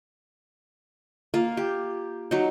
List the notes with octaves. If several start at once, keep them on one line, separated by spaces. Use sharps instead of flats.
A#3 F4
G4
F#3 D#4